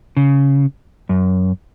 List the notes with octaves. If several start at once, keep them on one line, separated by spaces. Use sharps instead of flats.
C#3
F#2